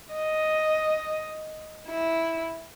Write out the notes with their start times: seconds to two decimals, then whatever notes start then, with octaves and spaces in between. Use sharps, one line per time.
0.13 D#5
1.89 E4